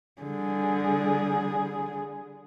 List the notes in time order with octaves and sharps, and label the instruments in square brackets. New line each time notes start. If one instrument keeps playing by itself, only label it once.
[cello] D3 G3 [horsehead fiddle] G#4